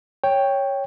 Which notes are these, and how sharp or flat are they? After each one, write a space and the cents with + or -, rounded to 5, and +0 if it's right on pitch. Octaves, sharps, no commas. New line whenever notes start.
C#5 +0 G5 +5